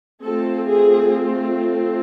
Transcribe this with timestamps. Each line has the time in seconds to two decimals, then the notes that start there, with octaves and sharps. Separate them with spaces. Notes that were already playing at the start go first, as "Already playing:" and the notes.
0.24 A3 C4 F4 A4
0.67 G#4